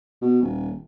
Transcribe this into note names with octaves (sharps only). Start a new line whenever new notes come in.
B2
D#1